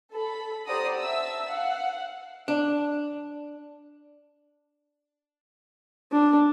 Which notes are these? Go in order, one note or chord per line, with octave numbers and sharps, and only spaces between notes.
A4 B5
G4 C5 D5 F#5 A#5 D#6
E5 A5 E6
F5 F#5
D4
D4